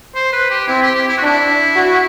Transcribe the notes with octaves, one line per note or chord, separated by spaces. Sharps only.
C5
B4
G4
C4 E4
G4
G4
E4
F#4
D4 E4
F#4